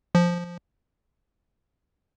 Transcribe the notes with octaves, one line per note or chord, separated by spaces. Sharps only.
F3